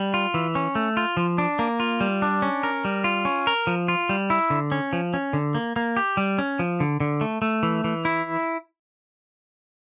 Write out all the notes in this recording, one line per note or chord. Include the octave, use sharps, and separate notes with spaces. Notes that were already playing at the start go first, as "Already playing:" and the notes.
Already playing: G3
F4
E3
C#4
A3
F4
F3
D4
A#3
F4
G3
D4
C#4
A#4
G3
F4
C#4
A#4
F3
F4
G3
E4
D3
C#4
F3
C#4
D3
A#3
A#3
G4
G3
C#4
F3
D3
D3
A3
A3
E3
E3
E4